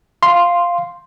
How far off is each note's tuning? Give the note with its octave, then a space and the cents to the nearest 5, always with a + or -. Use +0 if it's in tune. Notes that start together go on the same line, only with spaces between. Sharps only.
F5 +0 C6 +0